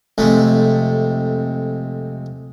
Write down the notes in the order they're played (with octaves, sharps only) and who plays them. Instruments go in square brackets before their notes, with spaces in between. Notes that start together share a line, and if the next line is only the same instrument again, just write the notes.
[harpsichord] F2 C3 G#3 A3